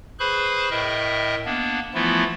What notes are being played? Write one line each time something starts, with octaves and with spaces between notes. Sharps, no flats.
G#4 B4 C5 B5 C#6 F#6
A2 A#4 D#5 E5 G5
A#3 B3 D4
E3 F3 A3 B3 E4 F4